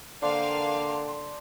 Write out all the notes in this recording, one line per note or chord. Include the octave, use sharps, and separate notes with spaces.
D3 A#3 D4 C5 F5 G5 A5 C6